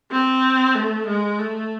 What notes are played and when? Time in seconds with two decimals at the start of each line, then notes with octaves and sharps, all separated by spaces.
0.12 C4
0.75 A3
1.06 G#3
1.39 A3